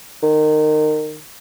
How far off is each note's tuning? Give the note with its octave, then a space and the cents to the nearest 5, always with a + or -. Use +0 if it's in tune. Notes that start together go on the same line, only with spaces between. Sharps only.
D#3 -25